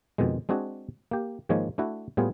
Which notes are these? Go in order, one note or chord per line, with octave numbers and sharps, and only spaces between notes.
F2 B2 D#3 G#3
G#3 C4 D4 F#4 G#4
A#3 G4
G#2 D#3 F3 G#3 A#3 C#5
A3 D4 E4 F#4
A2 G3 B3 F4 G#4